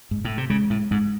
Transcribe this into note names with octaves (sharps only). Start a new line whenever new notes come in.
G#2
A2
C3
C#3 G#3
A2
G#2 G#3